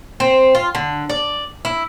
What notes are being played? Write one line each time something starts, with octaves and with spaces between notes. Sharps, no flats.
C4
F4
D3
D5
E4